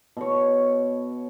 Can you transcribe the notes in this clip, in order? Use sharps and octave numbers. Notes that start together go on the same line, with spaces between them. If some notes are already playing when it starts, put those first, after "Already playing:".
B2 C#5